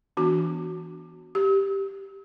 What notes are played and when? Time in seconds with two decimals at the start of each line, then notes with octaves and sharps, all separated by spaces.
0.17 E3 B3 D4 F#4
1.35 G4